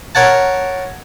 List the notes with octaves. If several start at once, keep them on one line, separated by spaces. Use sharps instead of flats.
A#4 C#5 F#5 A5